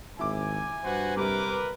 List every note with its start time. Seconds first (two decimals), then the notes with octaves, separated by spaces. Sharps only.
0.19 G#1 E4 G#5 D6
0.84 G2 F#4 B4 C5
1.17 C3 G3 A#4 B4 D6